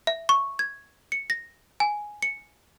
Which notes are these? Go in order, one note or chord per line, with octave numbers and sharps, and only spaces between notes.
E5
C#6
G#6
C#7
A#6
G#5
C#7